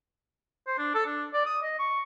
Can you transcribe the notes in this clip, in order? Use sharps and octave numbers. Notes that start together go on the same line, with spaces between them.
C5
D4
A4
D4
D5
D#6
D#5
C#6